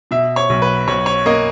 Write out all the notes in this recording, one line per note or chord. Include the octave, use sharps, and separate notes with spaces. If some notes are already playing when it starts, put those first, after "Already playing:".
B2 E5
C#5
B1
B4
B1 C#5
C#5
A#3 D#5